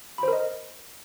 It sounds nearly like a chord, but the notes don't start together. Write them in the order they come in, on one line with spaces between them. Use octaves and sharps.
B5 C5 A#4 D#5